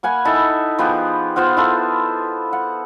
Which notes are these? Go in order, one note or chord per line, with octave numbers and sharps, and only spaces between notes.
A#3 F#5 G#5 B5
D#4 E4 A4 E5
F3 B3 G4 G#4
B3 F4 C5 F#5
E4 F4 A4
F#5